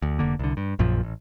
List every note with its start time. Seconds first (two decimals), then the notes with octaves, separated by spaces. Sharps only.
0.02 D2
0.19 F1 D3 A#3
0.39 C2 D3
0.57 G2
0.79 A#1 F#2 A#2 F3
1.03 A1